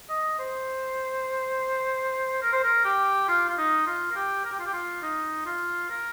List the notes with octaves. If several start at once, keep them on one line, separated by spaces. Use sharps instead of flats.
D#5
C5
A#4
C5
A#4
G4
F4
F4
D#4
F4
A#4
G4
A#4
G4
F4
G4
F4
D#4
F4
A#4